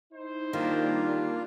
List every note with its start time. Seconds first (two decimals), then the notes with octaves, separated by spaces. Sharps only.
0.13 D#4 E4 C5
0.53 D#3 G3 A#3 D4 F4